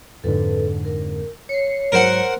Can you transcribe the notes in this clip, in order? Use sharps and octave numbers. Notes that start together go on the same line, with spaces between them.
F2 G#2 D3 A4 B4
A#4
C#5 C7 C#7
G#2 F#3 A#4 C5 F#5